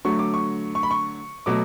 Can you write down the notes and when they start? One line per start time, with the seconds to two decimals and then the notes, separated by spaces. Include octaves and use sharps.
0.05 D3 F#3 A3 C#6
0.19 D6
0.34 C#6
0.75 C#6
0.83 B5
0.91 C#6
1.46 B2 F#3 A3 D6